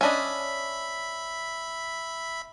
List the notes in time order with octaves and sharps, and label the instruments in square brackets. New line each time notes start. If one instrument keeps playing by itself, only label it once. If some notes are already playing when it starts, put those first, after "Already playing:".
[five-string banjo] C#4 D4 D#5 [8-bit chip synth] E5 B5